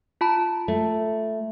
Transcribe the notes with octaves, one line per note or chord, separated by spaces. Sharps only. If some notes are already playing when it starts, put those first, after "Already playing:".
F4 A5 B5
A3